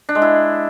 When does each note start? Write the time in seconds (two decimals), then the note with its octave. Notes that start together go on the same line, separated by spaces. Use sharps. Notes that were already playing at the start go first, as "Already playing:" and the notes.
0.09 D4
0.15 G#3
0.22 E4